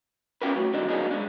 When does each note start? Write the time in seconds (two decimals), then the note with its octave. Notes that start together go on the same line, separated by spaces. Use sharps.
0.42 C#4 F4 G4 A#4 B4
0.55 A2 F#3
0.73 D3 D#3 F#3 G3 D4 D#4
0.87 F#3 A#3 D4 D#4 G#4
1.11 G#3 D4